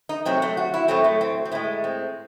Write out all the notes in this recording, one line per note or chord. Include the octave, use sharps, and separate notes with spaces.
D#4
C3 F#3 A3 C4
A3
F#4
E4
A2 F#3 A3 C4
A3
C4
C4
A2 G#3 A3
C4